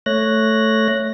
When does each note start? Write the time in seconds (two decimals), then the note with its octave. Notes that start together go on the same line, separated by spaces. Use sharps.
0.06 A3 C#5 F#6 A#6